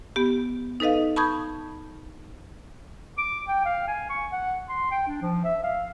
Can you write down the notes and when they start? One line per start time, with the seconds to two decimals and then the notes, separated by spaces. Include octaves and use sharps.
0.16 B3 G4
0.80 D#4 A4 B4 D#5 F5
1.16 A5 B5 C#6 D#6 G6 G#6
3.18 D6
3.47 G5
3.66 F5
3.88 G#5
4.10 C#6
4.32 F#5
4.69 C6
4.91 G5
5.08 D4
5.22 F3
5.45 E5
5.63 F5